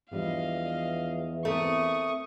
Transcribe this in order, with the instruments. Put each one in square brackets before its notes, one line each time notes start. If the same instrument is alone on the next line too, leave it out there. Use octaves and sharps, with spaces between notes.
[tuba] E2 [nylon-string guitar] F3 G3 D4 [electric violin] D#5 F5
[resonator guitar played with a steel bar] A3 [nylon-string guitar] C4 A#4 [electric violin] C#6 D#6